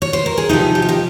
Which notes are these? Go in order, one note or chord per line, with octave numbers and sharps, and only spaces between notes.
C#5
C5
A#4
G#4
C3 F3 D#4 G4
G4
F4
D#4 G4